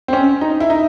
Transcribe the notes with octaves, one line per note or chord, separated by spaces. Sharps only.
C4
C#4
D#4
E4
D#4